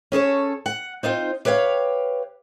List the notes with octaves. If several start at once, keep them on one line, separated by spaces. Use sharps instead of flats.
C#4 G#4 A4 C#5
F#5
C4 D#4 F4 C5
G4 B4 C#5 E5 F5